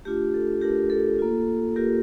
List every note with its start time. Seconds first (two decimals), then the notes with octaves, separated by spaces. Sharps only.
0.05 A3 D4 F4 G4
0.34 A4
0.61 A3 D4 F4 G4 A#4
0.90 A4
1.19 A#3 F4
1.76 A#3 F4 G4 A#4